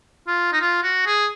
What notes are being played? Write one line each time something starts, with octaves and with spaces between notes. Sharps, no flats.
F4
D#4
F4
F#4
G#4